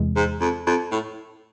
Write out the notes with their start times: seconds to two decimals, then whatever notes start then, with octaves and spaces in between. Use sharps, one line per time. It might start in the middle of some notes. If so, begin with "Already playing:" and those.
Already playing: E2 C3 E3 G#3
0.16 G#2
0.41 F2
0.67 F2
0.91 A2